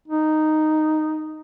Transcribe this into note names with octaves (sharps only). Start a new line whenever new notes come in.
D#4